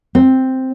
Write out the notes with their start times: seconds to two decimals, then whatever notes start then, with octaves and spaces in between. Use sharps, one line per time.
0.15 C4